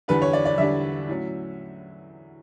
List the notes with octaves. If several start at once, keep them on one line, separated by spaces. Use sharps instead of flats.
E2 D3 G3 D4 B4
C#5
D5
D5
E2 D3 G3 D4 E5
A2 F#3 C#4